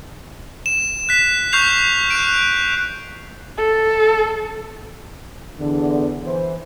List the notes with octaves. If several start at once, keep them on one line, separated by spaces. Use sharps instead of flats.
E7
F#6 B6
C#6 F6 G6 C7 F7
F#6 D7
A4
E2 D3
E3 C5